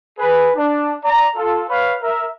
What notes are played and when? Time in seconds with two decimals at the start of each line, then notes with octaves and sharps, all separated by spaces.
0.18 G#4 B4
0.56 D4
1.04 D5 A#5
1.36 F4 A4
1.70 B4 C#5 F5 B5
2.03 A#4 E5